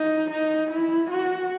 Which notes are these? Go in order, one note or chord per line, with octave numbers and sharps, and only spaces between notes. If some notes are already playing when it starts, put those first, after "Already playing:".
Already playing: D#4
D#4
E4
F#4